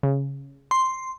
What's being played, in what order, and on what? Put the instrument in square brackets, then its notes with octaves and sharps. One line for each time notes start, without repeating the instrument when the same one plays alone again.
[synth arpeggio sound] C#3
[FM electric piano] C6